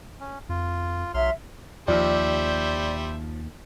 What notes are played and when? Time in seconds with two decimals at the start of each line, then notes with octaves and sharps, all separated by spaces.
0.20 C#4
0.49 F2 F4
1.14 B1 F#3 E5 C6 F6
1.88 D#2 F3 G3 C5 D5 E5